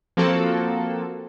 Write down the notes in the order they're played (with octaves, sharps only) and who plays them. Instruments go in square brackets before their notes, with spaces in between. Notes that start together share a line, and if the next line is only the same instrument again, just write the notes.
[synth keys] F3 A#3 C4 F#4 A4